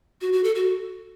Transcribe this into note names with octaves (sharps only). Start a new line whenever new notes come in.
F#4
F#4
A4
F#4